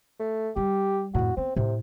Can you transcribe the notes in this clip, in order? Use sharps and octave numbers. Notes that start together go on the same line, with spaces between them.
A3
G3 G4
F2 A2 F#4
B3 C4
A2 C3